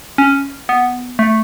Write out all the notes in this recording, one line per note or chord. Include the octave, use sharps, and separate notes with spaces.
C#4
B3
A3